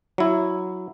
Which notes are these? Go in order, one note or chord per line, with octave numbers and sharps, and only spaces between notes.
F#3 E4